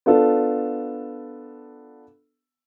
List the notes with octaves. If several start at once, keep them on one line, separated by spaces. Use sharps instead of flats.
B3 D4 F4 A4